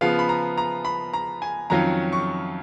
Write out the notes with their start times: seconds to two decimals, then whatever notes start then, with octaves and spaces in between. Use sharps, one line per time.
0.01 C#3 F3 B3 F4 F5
0.19 B5
0.29 A#5
0.58 A#5
0.85 B5
1.13 A#5
1.42 G#5
1.70 F2 D#3 F#3 C#4 F4 A#5
2.12 C#6